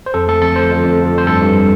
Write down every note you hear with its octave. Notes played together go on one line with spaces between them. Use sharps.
C5
F2 A4
A3 A4
F2 A4
F2 C5
F2
F2
F2
F2
C5
G2 A4
G2